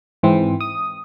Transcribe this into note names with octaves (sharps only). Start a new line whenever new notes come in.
G#2 E3 C4
D#6